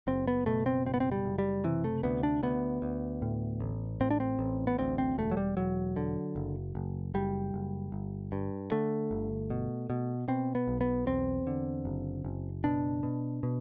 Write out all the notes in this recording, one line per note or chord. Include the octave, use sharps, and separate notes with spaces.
F#1 C4
B3
B2 A3
C4
F#1 C4
B3
C4
G3
F#1
G3
C3 E3
A3
D2 B3
D4
D2 B3
D2
A2
A1
A2 C4
D4
C4
A1
B3
D2 C4
C4
E1 A3
F#3
G3
E1 F#3
D3
F#1
F#1
F#1 G3
F#1
G1
G2
D3 A3
G1
B2
B2
B2 C4
B3
B1
B3
E2 C4
D3
F#1
F#1
B2 D4
B2
B2